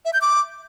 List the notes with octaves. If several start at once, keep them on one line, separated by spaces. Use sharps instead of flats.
E5
G6
D6